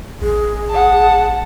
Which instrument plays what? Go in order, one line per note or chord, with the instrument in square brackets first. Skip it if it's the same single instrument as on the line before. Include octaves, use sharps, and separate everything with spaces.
[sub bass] A1 [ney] G#4
[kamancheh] F#5 A5